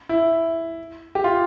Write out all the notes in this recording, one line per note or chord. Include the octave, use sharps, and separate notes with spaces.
E4
G4
F4